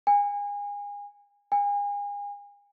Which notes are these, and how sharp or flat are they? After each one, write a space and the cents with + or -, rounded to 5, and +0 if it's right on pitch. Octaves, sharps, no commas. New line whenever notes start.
G#5 -30
G#5 -35